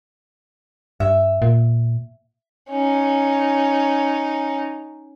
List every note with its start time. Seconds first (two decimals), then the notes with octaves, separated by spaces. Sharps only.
1.00 G2 E5
1.42 A#2
2.69 C#4 D#4